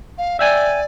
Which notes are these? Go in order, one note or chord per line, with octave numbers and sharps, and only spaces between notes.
F5
D5 E5 G5 G#5